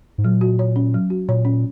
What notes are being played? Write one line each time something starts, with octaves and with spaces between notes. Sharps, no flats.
G#2
A#2 F#3
F#4
C#5
C#4
F#3
F#4
A#2 C#5
C#4